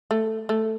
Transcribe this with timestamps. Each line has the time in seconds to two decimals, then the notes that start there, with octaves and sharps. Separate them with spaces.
0.11 A3
0.49 A3